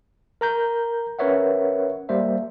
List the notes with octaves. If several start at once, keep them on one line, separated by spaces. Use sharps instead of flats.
A#4 A#5 G6
C#4 A#4 B4 C#5 E5 F#5
G3 A#3 C5 E5